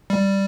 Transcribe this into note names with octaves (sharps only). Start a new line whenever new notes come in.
G3